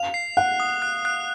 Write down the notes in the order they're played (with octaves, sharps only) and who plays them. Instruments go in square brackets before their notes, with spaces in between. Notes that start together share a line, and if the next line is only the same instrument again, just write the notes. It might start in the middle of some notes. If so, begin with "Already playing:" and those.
Already playing: [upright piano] F5 [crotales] F7
[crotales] C7
[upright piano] F#5 [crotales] F#6
[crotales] D#6
F#6
F#6